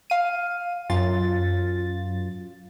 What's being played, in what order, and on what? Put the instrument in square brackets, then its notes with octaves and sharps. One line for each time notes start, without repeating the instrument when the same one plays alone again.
[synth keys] F5 D#7
F#2 F4 A6